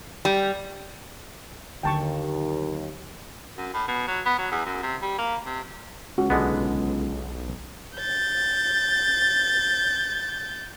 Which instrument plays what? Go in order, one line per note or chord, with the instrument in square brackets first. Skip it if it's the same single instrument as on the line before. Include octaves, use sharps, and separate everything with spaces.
[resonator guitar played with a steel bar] G3
[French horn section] D#2 [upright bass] D3 F#3 [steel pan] G5 A5 C#6
[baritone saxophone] F#2
A2
B2
F#3
B3
F#3
E2
F#2
C3
G3
A#3
C3
[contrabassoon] C#2 [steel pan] F#4
[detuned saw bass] B1 [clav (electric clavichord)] D3 G#3 B3
[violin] G6 A6